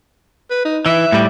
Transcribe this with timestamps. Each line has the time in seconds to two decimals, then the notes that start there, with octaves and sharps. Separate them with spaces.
0.50 B4
0.65 D#4
0.86 E3 E5
1.12 A2 G3